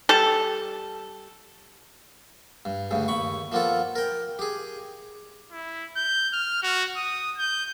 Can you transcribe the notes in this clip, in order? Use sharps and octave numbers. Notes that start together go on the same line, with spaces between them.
G3 A4
G2
D2 G2 C#3
D#2 B5 C#6
F3 A#3 B3 F4 A4
A#4 G5
G4 G#4
E4
G6
F6
F#4
D#6
G6